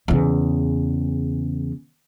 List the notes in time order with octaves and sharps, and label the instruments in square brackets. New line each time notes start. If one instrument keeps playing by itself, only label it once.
[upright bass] E2 C#3